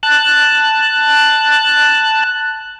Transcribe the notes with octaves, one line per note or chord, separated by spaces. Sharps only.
A5 F#6